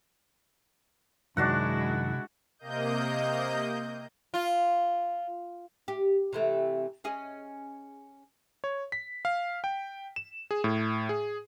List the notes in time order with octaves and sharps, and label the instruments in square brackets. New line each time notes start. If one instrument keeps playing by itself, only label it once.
[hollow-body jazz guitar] F#2 D#3 [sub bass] C3 [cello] G#3 E4 [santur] D4 F#4 F#5
[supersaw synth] C3 A#3 D#5 G6
[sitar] F4
[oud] G4
C3 E3 A3
C#4 G#4 D#5
[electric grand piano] C#5
B6
F5
G5
E7
G#4
A2
G#4